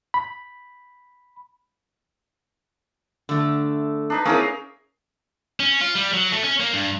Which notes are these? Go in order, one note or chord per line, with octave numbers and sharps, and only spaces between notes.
B5
D3 A3
D4 D#4 B4
A#3 C4 C#4 E4 G#4 A#4
C#4
F4
G3
F#3
A3
C#4
A#3
G2